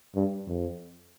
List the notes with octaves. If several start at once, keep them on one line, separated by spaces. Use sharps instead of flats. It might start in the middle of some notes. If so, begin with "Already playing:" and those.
G2
F2